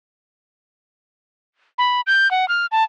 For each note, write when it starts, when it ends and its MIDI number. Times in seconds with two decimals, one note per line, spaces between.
1.78 2.01 83
2.07 2.30 91
2.31 2.48 78
2.48 2.66 89
2.72 2.84 81